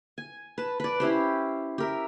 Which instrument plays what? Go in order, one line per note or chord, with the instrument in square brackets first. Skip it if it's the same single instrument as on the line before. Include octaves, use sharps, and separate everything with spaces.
[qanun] G#5
B4 A5
B4 D5
C#4 E4 G4 C5
G4 A#4 E5